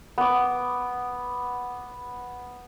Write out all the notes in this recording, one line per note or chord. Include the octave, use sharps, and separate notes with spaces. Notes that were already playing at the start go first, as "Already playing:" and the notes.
B3 D6